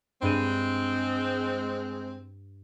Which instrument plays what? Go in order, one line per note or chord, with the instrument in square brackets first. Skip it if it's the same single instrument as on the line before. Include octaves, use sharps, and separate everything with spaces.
[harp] G2 D#7 [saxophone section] G#3 C4